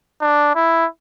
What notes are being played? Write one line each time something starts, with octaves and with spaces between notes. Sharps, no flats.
D4
E4